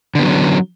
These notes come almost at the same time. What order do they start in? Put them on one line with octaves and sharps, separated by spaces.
D3 B3 F#3 C#4